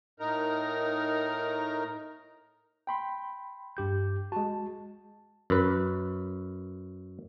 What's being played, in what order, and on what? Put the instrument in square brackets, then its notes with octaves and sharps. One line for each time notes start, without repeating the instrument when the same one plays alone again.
[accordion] A2 D#4 A#4 A#5
[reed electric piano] G5 B5 C6
[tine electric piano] G2 G4 G6
[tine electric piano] G#3 F#4 [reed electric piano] A5
[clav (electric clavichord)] F#2 B4